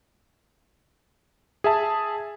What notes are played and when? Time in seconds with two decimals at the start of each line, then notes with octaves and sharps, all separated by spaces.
1.64 G#4 E5 A5